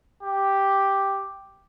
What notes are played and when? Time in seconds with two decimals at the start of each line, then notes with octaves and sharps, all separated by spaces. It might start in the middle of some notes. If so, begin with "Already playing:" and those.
0.23 G4